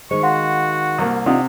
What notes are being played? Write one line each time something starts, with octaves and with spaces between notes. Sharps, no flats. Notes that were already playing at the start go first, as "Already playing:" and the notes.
D#3 G#3 C5 C#6
F#4 F5 F#5 C6
C2 A#3
C3 D4 D#4 F4 F#5 D#6